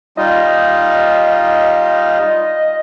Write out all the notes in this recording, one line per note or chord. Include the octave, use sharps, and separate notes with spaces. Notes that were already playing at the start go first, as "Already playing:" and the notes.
G3 D#4 F4 D#5